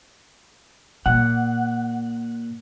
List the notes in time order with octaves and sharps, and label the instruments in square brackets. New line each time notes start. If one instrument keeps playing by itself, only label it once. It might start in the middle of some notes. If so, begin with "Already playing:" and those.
[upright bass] A#2 [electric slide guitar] F#5